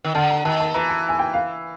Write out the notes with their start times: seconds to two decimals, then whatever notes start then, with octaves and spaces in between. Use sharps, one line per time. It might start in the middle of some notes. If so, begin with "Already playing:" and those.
0.04 D#3
0.15 D3 A5
0.30 A#5
0.45 D#3 A5
0.60 A5
0.74 E3 A#5
0.89 A5
1.09 G#5
1.19 G5
1.33 F5